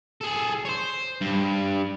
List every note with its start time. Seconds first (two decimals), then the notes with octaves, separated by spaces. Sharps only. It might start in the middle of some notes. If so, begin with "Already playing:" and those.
0.21 G#4 A4
0.65 C5 C#5
1.21 G2